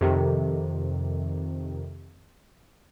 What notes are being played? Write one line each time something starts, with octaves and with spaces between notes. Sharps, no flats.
F2 C3 D#3